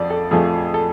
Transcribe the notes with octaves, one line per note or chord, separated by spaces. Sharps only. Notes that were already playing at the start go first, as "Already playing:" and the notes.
Already playing: F2 F3 D5
A4
F2 F3 A3 G#4
A4